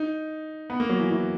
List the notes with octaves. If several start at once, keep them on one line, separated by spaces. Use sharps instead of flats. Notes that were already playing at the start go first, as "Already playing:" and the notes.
Already playing: D#4
B3
A#3
F#3
E3
E3